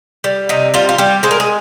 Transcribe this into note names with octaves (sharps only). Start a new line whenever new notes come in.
G3
C3 D#4
G3 F4
F4
G3 G4
G#3 C5
A#4
G#4